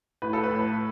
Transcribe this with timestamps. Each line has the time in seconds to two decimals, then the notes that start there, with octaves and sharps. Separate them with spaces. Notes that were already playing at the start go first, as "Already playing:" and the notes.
0.22 A2 B4
0.33 A4
0.44 B4
0.51 A2